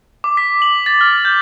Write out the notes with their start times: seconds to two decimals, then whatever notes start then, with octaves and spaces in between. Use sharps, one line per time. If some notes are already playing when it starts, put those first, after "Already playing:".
0.24 D6
0.37 B6
0.62 F#7
0.86 A6
1.01 F6
1.25 G6